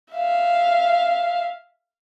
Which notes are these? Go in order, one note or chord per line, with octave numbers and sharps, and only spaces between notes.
E5 F5